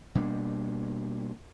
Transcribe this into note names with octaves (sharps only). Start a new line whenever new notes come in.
B2 G3 A#3 D4